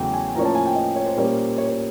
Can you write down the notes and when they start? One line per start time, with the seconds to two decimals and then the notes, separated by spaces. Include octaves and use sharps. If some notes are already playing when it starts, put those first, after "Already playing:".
Already playing: E2 C#3 F#3 A3 G5
0.14 G#5
0.34 A2 F3 A#3 C#4 A#5
0.45 A5
0.55 G#5
0.65 G5
0.76 D#5
0.96 C#5
1.06 C5
1.16 A#2 G3 A#3 C#4
1.58 C#5
1.68 C#5